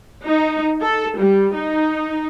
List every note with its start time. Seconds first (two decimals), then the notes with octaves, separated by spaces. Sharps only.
0.25 D#4
0.82 A4
1.17 G3
1.53 D#4